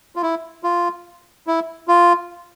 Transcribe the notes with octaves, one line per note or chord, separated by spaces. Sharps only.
F4
E4
F4
E4
F4